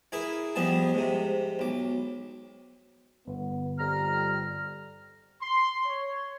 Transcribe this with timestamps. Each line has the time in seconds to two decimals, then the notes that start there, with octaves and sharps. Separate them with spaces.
0.12 E4 G#4 A#4 B4
0.56 C2 F2 G3 B3 G#4 A5
0.94 G#2 C3
1.59 B1 D6
3.27 G1 B3
3.78 F2 G3 A#5 F6
5.42 C6
5.86 C#5